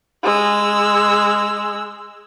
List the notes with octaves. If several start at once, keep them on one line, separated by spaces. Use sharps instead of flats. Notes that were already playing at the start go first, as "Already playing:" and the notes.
G#3 E6